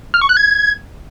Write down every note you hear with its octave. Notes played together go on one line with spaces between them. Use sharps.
F6
C#6
F#6
G#6